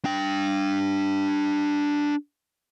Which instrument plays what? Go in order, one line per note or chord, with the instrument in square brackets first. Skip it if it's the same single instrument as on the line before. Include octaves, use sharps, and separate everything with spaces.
[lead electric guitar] D4 G5